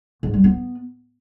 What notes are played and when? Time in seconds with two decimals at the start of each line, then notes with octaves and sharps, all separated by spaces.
0.23 G#2
0.34 G3
0.44 B3